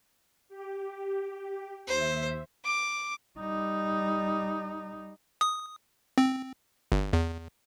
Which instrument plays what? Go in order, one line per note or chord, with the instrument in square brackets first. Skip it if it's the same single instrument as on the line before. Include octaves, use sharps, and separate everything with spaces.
[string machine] G4
[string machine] D#2 E5 [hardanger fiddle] C5
[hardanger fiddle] D6
[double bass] G3 D#4
[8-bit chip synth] D#6
C4
G1
E2